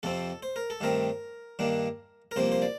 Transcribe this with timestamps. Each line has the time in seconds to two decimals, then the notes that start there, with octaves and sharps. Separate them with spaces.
0.03 F2 C3 F3 C4 A4
0.43 C5
0.56 A#4
0.70 A4
0.81 G2 D#3 A3 C4 A#4
1.59 G2 D#3 A#3 D4
2.31 A#4
2.36 C2 C3 F3 A#3 C5
2.52 C5
2.62 D5